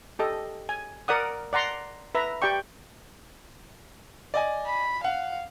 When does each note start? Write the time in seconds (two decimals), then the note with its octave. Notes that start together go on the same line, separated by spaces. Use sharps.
0.19 G4 A4 D#5
0.69 G#5
1.08 A#4 D5 F#5 D#6
1.53 D5 F#5 A#5 C6
2.15 B4 E5 A#5
2.42 G4 D5 G5 C#6
4.34 D5 D#5 G#5
4.66 B5
5.04 F5 F#5